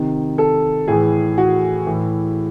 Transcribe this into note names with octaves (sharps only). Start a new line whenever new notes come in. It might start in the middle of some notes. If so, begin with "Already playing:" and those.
Already playing: C3 D#3
A4
A2 E3 G#4
F#4
A2 E3